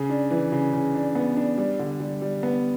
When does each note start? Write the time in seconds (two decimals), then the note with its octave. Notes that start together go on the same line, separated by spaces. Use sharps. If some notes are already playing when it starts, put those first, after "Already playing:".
Already playing: C#3
0.10 D4
0.31 E3
0.52 C#3
0.73 C#3
0.94 D4
1.15 B3
1.36 D4
1.58 G3
1.79 D3
2.00 G3
2.22 G3
2.43 B3